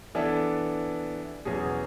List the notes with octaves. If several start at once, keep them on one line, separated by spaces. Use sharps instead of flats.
E3 B3 D4 A4
E2 B2 F#3 C#4 G#4